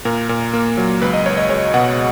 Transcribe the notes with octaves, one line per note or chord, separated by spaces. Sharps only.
A#2 A#4
A#2
A#3
F#3
C#2 B4
D#5
C#2 C#5
D#5
G#3 C#5
B2 F#5